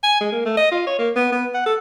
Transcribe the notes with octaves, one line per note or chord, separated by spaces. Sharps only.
G#5
G#3
A#3
A3
D#5
F4
C#5
A#3
B3
B3
F#5
A4